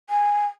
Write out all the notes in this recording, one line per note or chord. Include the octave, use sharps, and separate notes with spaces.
G#5